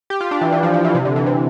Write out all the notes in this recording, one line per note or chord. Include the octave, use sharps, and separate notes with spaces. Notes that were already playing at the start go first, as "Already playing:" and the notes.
G4
F4
D4
E3
E3
F3
F3
E3
C3
D3
E3
C3